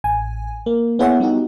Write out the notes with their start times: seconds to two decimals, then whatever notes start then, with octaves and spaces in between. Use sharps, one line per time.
0.04 A1 G#5
0.66 A#3
0.99 B3 E4 G#4 C#5 E5 F#5
1.20 G3 B3 D#4 F#4 G4